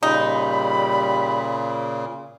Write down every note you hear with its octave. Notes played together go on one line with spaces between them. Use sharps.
A#2 C#3 G3 D#4 B5